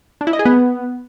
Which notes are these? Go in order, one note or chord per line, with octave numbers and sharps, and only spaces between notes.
D4
E4
D#5
G#4
B3